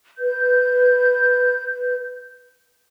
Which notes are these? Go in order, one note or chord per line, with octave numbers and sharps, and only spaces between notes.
B4 G6